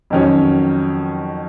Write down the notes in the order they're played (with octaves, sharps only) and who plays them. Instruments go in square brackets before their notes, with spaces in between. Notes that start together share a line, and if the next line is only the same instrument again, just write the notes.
[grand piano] F2 D#3 F#3 C#4